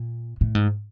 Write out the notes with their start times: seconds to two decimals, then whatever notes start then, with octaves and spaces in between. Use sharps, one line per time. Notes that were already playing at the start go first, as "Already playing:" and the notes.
Already playing: A#2
0.41 A2
0.55 G#2